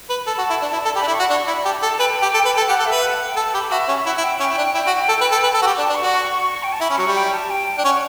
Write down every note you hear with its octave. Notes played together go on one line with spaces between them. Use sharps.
B4
A4 A5
F#4
E4
D4
E4
A4
G4 B5
D4
E4
C#6
F#4
D4 C#6
E4 B5
G4 A5
A4 A5
B4 G5
G4
A4
B4
A5
A4
G5
G4 F#5
A4
B4 E5
F#5
G5
A4 A5
G4 B5
F#4 E5
C#4
E4 F#5
E4
G5
C#4 G5
E4
D4
E4 G5
F#4
A4
B4
A4
B4
A4
F#4
G4
D4 A5
D4
C#6
F#4
G5
A5
E4 B5
C#4
F#3 C#6
G3
G5
A5
G5
D4
C#4 F#5